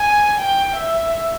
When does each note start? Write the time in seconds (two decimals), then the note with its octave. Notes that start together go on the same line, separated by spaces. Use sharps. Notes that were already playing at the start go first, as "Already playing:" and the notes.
Already playing: G#5
0.38 G5
0.76 E5